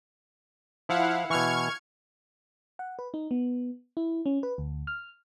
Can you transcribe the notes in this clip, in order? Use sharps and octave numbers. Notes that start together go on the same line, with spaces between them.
F3 E4 F5 F#5
B2 E3 C#6 F6 G#6
F#5
B4
D#4
B3
E4
C#4
B4
D2
F6